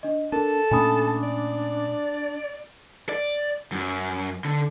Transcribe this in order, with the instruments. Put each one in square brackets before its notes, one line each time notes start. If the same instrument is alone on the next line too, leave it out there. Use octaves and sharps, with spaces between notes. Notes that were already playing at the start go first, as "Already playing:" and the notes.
[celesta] D4 D#5
[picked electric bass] D4 [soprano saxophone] A4 [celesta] A#4
[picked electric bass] A#2 A3 C#4 [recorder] D4 [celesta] G#5 B5 D#6
[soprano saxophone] D5
[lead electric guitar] D5
F#2
D3